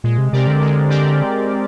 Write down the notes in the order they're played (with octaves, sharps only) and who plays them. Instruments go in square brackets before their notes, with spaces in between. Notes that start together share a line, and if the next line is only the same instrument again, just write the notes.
[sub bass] A#2 [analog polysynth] G#3
[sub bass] C3
[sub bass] C3 [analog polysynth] C4 G4 A#4 D5
[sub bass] D3
[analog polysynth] G#3
C4 G4 A#4 D5